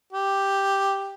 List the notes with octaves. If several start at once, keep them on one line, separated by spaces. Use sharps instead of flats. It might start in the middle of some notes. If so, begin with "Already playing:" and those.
G4